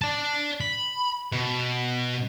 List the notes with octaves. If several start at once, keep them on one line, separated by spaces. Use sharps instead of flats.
D5 A5
B5
B2